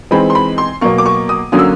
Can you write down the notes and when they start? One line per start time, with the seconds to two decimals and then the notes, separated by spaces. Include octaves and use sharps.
0.11 E3 G#3 C4 D#4 B5
0.30 C6
0.35 B5
0.58 C6
0.81 B2 F#3 A#3 C#6
0.98 D6
1.06 C#6
1.29 D#6
1.52 D3 F#3 A#3 C#4 D#6
1.59 E6